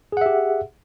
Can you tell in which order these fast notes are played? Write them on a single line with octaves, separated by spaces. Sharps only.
G#4 F#5 E5 G4